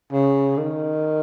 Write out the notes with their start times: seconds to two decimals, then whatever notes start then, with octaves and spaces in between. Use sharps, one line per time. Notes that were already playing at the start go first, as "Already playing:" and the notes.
0.12 C#3
0.57 D#3